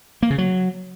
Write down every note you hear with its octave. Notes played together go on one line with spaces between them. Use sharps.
A#3
C#3
F#3